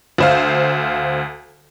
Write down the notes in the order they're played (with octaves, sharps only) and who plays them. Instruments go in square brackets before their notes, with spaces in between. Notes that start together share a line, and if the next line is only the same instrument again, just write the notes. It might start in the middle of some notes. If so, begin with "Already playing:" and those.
[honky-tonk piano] D2 C5 F5